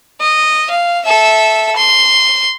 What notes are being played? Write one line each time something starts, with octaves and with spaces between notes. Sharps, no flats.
D#5
F5
A4 E5
C6